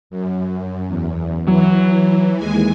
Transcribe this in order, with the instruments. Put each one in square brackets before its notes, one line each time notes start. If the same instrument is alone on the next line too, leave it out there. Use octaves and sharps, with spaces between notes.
[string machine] F#2
E2
[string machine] E3 [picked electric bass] F#3
[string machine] D#2 G#3 G#5